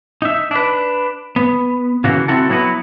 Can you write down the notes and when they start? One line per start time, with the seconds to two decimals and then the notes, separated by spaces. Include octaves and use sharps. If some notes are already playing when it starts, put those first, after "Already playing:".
0.22 D#4 E5
0.51 D4 B4
1.36 B3
2.04 C#3 E3 A#3 F#4
2.28 C4 E4 F#4 A4
2.49 F#3 B3 E4 F#4 B4